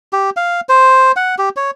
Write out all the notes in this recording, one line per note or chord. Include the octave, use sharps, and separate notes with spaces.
G4
F5
C5
F#5
G4
C#5